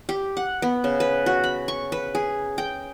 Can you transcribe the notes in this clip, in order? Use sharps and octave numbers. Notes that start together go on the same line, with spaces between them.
G4
F#5
B3
C#3
B4
F#4
B5
C#6
B4
G#4
G5